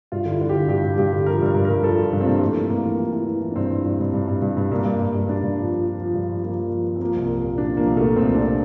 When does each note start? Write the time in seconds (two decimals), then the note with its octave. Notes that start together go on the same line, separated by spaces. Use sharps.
0.12 G2 F4
0.25 D3
0.31 E4
0.41 D3
0.49 G4
0.55 D3
0.68 G2 G4
0.83 G2
0.98 G2 G4
1.13 D3
1.26 F3 A#4
1.41 G2
1.46 A#4
1.55 G2
1.65 G2 A#4
1.84 F3 A4
1.98 F3 F4
2.13 G2 D4
2.20 C4
2.26 G2 A#3
2.41 E3 A3
2.55 E3
2.70 G2 A#3
2.85 E3
2.99 E3
3.13 E3
3.28 E3
3.42 E3
3.51 D4
3.56 G2 C4
3.71 E3
3.85 G2
4.00 G2
4.13 G2
4.27 G2
4.42 G2
4.57 G2
4.71 G2 A#3
4.85 G2
4.99 G2
5.15 G2
5.28 G2 D4
5.44 G2
5.58 F3
5.72 F3
5.86 F3
6.00 F3
6.14 G2
6.29 F3
6.44 F3 A#3
6.58 F3
6.72 F3
6.86 F3
6.96 C4
7.00 F3 A#3
7.16 C2
7.30 F3
7.44 A#2
7.58 F3 D4
7.73 F3 A#3
7.87 C2
7.97 A#2 A3
8.16 C2 C4
8.30 C2 D4